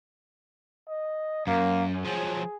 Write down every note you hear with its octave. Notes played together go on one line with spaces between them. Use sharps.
D#5
F#2 A#3
F3 F#3 G#4